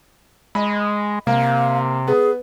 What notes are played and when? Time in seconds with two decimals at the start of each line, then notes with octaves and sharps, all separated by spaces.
0.55 G#3 D#5 B5
1.27 C3 A#3 F5
2.08 B3 G#4